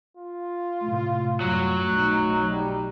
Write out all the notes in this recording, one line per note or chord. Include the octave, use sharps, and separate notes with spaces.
F4
A2 C3 A3
F#2 F#3 G3
B1 D#4
G3